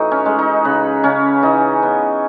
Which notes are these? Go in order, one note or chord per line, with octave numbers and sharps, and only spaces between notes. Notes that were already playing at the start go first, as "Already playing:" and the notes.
Already playing: A2 E3 D#4 F#4
C#4
G#3
D#4
C#3 B4
C#3 C#4
E3 D#4
B3